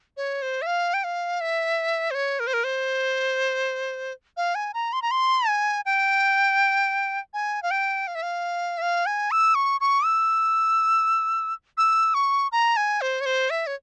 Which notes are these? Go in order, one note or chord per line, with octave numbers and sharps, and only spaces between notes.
C#5
C5
E5
F5
G5
F5
E5
C5
C#5
A#4
C5
A#4
C5
F5
G#5
A#5
C6
A#5
C6
G#5
G5
G#5
F5
G5
F5
E5
F5
E5
F5
G#5
E6
C#6
C#6
E6
E6
C#6
A#5
G#5
C5
C#5
C5
E5
C#5